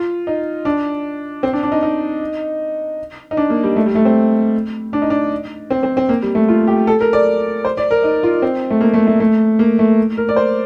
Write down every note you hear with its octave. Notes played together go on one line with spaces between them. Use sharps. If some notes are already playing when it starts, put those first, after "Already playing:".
Already playing: F4
D#4
D4
C4
D4
D4
D#4
D#4
D#4
D4
A#3
G3
A3
G3
A3
C4
D4
D#4
D4
C4
C4
C4
A#3
G3
A3
F4
G4
A4
A#4
D5
C5
D5
A#4
D#4
F4
C4
A3
A#3
A3
A3
A3
A#3
A3
A#4
D5
C5